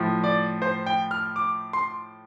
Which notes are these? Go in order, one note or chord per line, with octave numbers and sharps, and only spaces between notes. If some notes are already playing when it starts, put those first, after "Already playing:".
Already playing: A2 F3
D5
C5
G5
F6
D6
C6